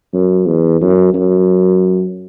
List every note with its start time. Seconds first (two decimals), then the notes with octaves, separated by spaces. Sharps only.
0.13 F#2
0.46 E2
0.81 F#2
1.14 F#2